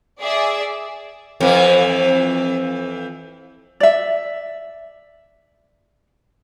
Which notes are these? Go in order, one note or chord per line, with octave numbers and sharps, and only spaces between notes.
G#4 D5 E5
F2 E3
D5 E5